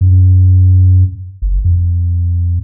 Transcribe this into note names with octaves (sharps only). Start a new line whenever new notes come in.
F#2
F#1
F2